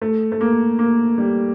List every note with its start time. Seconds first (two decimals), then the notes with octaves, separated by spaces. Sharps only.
0.02 A3
0.32 A3
0.41 A#3
0.79 A#3
1.18 G3